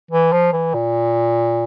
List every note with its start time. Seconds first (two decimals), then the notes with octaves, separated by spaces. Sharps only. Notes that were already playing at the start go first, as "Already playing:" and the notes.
0.11 E3
0.33 F3
0.53 E3
0.74 A#2